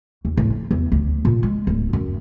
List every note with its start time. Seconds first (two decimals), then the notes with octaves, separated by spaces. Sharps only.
0.25 D#2
0.37 A2
0.50 F3
0.71 E2
0.92 D2
1.25 A#2
1.43 G#3
1.67 D1
1.93 F#2